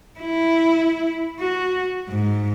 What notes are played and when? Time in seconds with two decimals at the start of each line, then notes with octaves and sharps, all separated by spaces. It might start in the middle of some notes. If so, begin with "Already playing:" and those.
0.20 E4
1.40 F#4
2.09 G#2